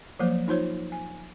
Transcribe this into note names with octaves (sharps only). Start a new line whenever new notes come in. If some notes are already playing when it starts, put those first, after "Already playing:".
F3 F#3 A#3 C5
D#4 F4 C5 C#5
G#5